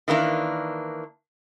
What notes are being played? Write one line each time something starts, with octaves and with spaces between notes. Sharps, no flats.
D#3 E3 A#3 D4